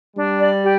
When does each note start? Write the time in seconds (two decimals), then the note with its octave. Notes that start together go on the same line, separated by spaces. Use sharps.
0.15 G3 D4
0.39 D5
0.64 G4